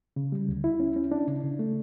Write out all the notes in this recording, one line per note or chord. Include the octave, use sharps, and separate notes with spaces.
C#3
G3
D2
E4
C#4
C#4
D4
C#3
C#3
A3